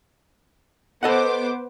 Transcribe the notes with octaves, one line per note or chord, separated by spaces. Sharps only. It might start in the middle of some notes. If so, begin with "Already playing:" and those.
B3 A4 C5 D#5 F#5 D6